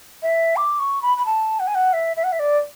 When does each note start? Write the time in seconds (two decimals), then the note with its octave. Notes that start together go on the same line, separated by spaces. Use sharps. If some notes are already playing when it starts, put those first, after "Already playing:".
0.23 E5
0.57 D6
0.79 C#6
1.02 B5
1.18 B5
1.26 A5
1.60 F#5
1.67 G#5
1.75 F#5
1.93 E5
2.17 E5
2.24 F#5
2.32 E5
2.39 D5